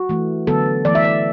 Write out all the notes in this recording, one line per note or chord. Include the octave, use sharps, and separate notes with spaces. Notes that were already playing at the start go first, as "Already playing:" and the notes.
Already playing: F#4
E3 A3
D3 F#3 B3 A4
E3 A3 D5
E5
D5